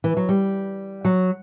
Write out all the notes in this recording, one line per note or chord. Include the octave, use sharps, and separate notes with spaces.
E3
F#3
G3
F#3